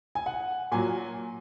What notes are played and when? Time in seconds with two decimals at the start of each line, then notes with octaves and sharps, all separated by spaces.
0.15 G#5
0.26 F#5
0.72 A#2 F#3 G#5